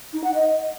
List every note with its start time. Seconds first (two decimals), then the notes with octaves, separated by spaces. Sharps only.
0.13 D#4
0.24 F#5
0.35 D#5